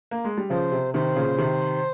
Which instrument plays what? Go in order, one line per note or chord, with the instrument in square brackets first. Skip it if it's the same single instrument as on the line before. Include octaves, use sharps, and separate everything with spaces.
[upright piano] A#3
G#3
G3
[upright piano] C#3 F3 [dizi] C5
[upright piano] C3
[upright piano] C3 D#3 [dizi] C5
[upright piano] A#2 C#3
C3 D#3